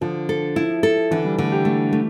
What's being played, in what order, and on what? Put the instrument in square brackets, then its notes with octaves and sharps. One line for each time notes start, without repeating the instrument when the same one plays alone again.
[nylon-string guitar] D3 [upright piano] F3
[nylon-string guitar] A4
E4
A4
[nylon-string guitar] D3 [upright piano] E3
[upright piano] G3
[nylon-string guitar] D3 [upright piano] A3
[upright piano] G4
[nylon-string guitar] A3
A3